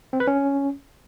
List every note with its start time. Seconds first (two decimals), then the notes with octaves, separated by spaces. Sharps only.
0.13 C4
0.20 B4
0.27 C#4